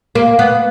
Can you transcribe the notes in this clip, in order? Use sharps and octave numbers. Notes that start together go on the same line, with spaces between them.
A#3
B3